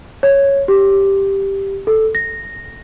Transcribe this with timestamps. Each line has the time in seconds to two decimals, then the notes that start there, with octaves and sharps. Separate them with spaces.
0.23 C#5
0.68 G4
1.87 A4
2.15 A#6